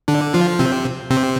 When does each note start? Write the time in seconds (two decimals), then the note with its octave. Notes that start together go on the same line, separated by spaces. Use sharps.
0.08 D3 D4
0.34 F3 F4
0.59 C3 C4
1.10 C3 C4